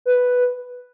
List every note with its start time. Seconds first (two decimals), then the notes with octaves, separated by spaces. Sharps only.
0.06 B4